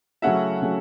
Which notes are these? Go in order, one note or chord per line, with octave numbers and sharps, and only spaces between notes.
C#3 F#3 A3 C#4 E4 E5 F#5
C#3 F#3 A3 C#4